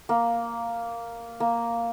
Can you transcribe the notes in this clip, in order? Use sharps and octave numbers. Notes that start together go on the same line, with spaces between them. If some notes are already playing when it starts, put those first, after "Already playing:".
A#3
A#3